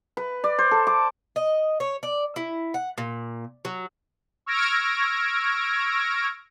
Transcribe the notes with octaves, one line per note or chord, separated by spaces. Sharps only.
B4
D5
C5
A4
D6
D#5
C#5
D5
E4
F#5
A#2
F#3
C#6 E6 F6 G#6 A#6 D7